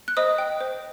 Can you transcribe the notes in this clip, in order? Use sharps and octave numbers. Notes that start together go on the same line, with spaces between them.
F#6
C5 D#5 D#6
G5
C5